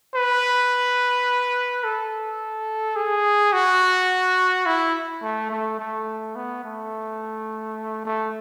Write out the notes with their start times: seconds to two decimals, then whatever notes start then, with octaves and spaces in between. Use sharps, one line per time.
0.14 B4
1.84 A4
2.96 G#4
3.53 F#4
4.66 E4
5.22 A3
5.51 A3
5.79 A3
6.36 B3
6.64 A3
8.05 A3